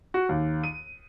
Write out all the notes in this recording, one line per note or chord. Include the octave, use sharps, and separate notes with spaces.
F#4
D#2
D#7